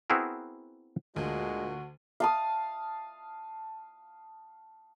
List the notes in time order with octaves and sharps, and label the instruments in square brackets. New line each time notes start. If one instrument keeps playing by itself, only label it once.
[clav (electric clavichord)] B3 C4 E4 F#4 G#4 A#4
[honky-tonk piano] D2 [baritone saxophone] A#2 [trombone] G#3 [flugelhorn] F#4
[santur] F5 A5 D#6